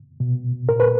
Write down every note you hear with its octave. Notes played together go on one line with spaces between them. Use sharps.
B2
A#2 A#4
B4